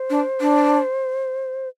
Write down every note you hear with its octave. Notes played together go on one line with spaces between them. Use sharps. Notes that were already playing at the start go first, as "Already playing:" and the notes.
Already playing: C5
D4
D4